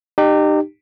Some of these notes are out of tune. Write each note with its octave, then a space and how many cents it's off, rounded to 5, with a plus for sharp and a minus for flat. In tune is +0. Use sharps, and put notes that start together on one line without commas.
D#4 -35 G4 +0